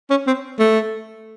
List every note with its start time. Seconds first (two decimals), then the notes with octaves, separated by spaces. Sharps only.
0.10 C#4
0.27 C4
0.59 A3